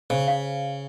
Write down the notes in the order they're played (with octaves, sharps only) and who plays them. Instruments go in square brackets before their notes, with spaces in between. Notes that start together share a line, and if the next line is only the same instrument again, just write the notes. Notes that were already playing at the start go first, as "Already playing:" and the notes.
[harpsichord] C#3 [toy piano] C5
[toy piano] F5